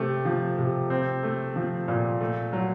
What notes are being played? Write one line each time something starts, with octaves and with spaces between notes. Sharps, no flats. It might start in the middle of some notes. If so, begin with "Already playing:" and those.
Already playing: C3 A3
F3
C3
C4
A3
F3
A#2
A3
F#3